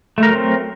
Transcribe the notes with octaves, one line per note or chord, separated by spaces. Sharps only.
F#3 A3 C4 A#4